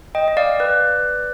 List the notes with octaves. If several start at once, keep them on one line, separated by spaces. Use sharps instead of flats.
D#5 G5
D#5
D5 F5
B4 D5